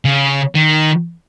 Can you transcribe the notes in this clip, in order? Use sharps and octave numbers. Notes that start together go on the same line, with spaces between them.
C#3
D#3